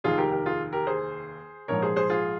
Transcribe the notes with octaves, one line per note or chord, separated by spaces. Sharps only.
F1 D#2 D#3 F4 G#4
G4 A#4
G4 A#4
F4 G#4
G4 A#4
G#4 C5
A#1 G#2 F3 A#4 C#5
G#4 C5
G#4 C5
F4 G#4